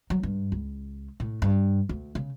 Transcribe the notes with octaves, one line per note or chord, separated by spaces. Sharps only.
F#3
G2
C#2
A2
G2
D2
C#3